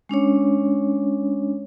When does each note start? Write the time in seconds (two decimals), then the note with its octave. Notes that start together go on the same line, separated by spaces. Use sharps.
0.09 G#3 C#4 D4 C#5